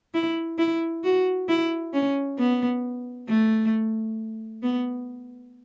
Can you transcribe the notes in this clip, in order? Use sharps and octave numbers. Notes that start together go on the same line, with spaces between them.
E4
E4
F#4
E4
C#4
B3
A3
B3